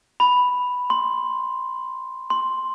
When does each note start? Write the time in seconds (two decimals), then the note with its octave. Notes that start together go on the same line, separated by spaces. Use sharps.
0.20 B5
0.90 C6
2.30 C6